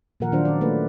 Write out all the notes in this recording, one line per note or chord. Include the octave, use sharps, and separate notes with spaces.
A#2 D#3 F3 A#4 F#5
D#3 F#3 D4 F4 C5
D#3 C#4 D5
A3 A#3 B4